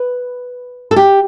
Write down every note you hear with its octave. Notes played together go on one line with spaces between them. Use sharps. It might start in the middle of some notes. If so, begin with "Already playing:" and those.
Already playing: B4
A4
G4